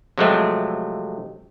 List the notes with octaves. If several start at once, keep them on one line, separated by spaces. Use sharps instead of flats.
C3 F3 F#3 G#3 A3 C4